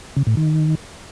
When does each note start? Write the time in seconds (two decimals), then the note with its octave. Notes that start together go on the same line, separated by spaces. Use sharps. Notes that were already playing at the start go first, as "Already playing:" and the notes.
0.17 C#3
0.27 A2
0.37 D#3